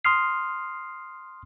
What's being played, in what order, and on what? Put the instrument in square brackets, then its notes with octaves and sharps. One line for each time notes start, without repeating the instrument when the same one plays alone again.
[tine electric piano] C6 D#6 F6 C7